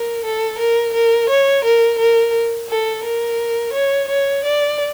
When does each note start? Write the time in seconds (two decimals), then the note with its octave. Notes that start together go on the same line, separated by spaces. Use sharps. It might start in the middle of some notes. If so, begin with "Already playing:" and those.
Already playing: A#4
0.25 A4
0.59 A#4
0.94 A#4
1.30 C#5
1.65 A#4
1.99 A#4
2.69 A4
3.04 A#4
3.73 C#5
4.09 C#5
4.44 D5